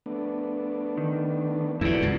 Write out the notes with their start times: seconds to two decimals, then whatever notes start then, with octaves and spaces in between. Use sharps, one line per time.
0.06 A3 B3 D4
0.98 D#3
1.81 E2 B2 B3 E4 F#4 A4 D5
2.02 C#2 G#2